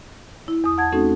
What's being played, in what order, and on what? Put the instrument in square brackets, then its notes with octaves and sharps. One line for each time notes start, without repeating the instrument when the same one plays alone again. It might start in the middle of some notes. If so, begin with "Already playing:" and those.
[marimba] E4
E2 D#6
F#5 A5 G#6
A3 C4 C#4 D#4 F#4 A4